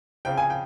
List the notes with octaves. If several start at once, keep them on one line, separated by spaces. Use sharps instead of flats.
F2 C#3 F3 G5
G#5
G5